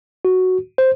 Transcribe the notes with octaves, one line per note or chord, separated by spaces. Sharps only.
F#4
C5